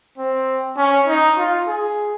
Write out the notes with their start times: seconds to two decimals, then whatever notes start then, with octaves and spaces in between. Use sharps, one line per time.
0.18 C4
0.77 C#4
1.07 D#4
1.37 F4
1.67 G#4